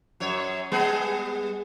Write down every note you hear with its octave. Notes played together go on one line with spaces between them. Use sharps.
F#2 C#5
G3 B3 G#4